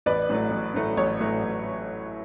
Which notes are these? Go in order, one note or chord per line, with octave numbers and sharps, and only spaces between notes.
A1 B4 D5
A2 F#3 A3
A1
A2 F#3 A3
A1 C#5
A2 F#3 A3
A1